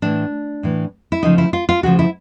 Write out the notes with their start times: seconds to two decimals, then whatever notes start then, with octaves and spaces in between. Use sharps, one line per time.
0.02 A2 E3 D4
0.63 A2 E3
1.12 E4
1.23 D2 C#3 F3 D#4
1.38 E4
1.53 F4
1.69 F4
1.83 D2 C#3 F3 F#4
1.99 E4